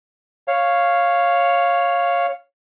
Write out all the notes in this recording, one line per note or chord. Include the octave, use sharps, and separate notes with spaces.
C#5 F5